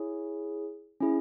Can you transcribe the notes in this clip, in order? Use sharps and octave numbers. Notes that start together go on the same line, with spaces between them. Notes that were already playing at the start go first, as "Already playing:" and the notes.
Already playing: E4 G#4 C#5
C#4 E4 G#4